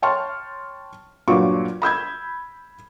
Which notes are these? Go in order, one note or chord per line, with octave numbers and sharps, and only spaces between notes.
C#5 G5 A5 C6 C#6 F6
G2 A#2 F#3 F4 C#6 D6
B5 E6 G6 G#6